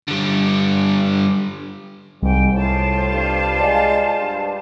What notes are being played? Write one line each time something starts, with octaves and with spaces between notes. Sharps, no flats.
D3 G3
C2 G#2 G5
A2 F4 C5 A5
G2
G#3 D5 F5
G2